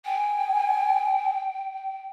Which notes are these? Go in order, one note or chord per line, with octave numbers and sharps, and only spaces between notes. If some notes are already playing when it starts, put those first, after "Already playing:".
G5 G#5